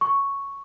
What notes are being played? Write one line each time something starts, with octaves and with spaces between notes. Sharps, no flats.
C#6